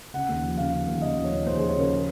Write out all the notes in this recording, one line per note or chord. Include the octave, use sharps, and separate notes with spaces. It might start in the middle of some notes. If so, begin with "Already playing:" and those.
C#3 F#5
D#2
F3
C#3 F5
C#3
D#2
C#3 D#5
F3
C#5
D#2
D#2 C5
F3 G#4
C#5
C#3 A#4
A#4